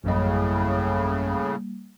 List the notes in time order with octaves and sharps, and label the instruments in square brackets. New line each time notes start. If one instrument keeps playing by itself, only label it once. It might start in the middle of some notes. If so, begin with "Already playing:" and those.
[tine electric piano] A1 F#2 D#5 [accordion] A2 C#3 [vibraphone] G3 A#3